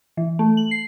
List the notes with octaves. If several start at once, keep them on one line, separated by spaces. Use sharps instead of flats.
E3
A3
F#7
C7